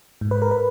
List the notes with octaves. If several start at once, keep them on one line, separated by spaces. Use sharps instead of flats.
G#2
B4
A#4
B4